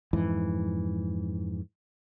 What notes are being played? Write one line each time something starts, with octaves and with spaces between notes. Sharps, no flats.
F2 G#2 E3